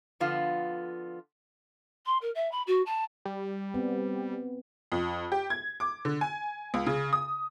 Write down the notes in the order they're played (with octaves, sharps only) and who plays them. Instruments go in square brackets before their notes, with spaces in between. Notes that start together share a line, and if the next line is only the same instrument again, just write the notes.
[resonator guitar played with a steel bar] D3 F3 B3 F4
[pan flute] C6
A#4
E5
B5
F#4
A5
[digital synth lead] G3
[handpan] B3 C4
[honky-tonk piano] F2
G4
G#6
D6
D3
G#5
C#2
C#3
D#6